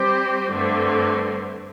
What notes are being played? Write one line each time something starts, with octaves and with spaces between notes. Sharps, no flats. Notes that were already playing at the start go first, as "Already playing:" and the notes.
Already playing: G3 C4 G4 C5
G2 D3 A3 C4